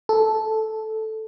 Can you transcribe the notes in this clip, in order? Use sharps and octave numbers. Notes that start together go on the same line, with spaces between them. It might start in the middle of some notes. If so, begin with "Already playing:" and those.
A4